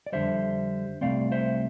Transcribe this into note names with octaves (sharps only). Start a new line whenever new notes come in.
D5
F2 D3 G3 C5 E5
C2 A#2 A3 C4 D5 F5
C5 E5